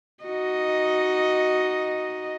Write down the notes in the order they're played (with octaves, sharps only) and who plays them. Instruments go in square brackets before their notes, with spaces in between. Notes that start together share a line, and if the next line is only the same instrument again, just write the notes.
[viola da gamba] D#4 F#4 D#5